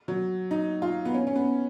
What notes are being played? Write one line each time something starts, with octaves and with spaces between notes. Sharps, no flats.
F#3
D#4
F4
B3
C#4
C#4
B3